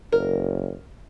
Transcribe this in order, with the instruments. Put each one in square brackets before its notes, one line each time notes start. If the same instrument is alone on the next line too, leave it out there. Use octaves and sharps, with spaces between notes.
[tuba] F#1 [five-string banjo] A#4